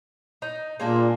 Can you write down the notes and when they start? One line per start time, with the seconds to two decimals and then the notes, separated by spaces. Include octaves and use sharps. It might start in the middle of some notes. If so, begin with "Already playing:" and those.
0.42 D#4
0.80 A#2 G#3 A#3 D4